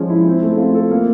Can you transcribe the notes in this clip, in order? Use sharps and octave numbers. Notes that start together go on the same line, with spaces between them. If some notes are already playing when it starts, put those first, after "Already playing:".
Already playing: F3 G#3 C#4
E4
C4
A3
F4
A4
A#3